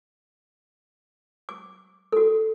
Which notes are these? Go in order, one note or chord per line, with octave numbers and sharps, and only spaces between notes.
D6
F#4 A4